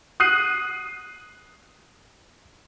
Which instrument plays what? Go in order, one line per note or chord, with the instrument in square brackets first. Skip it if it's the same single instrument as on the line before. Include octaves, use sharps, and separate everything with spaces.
[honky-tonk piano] D#6 F#6 C7 D#7